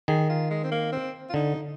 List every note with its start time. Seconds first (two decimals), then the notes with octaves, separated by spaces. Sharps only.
0.08 D#3 G#4
0.29 F4
0.50 G#3
0.64 C4
0.71 A#3
0.92 C4
1.30 F4
1.34 D3 D#4